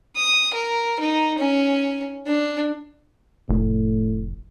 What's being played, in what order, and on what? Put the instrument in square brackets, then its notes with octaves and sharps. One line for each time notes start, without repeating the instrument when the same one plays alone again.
[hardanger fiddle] D#6
A#4
D#4
C#4
D4
[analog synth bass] F1 [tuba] A2